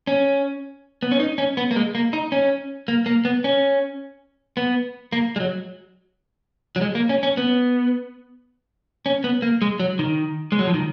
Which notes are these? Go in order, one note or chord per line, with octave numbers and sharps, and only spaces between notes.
C#4
B3
C#4
D#4
C#4
B3
A#3
G#3
A#3
D#4
C#4
A#3
A#3
B3
C#4
B3
A#3
G#3
F#3
F#3
G#3
A#3
C#4
C#4
B3
C#4
B3
A#3
G#3
F#3
D#3
G#3
F#3
F3
D#3